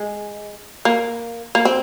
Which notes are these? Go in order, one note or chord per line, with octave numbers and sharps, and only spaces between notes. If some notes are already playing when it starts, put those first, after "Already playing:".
Already playing: G#3
A#3
A#3
C4